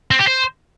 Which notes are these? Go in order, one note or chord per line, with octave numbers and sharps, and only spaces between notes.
C4
G4
C5